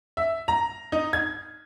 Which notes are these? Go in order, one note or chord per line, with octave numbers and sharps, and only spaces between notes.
E5
A#5
D#4
G#6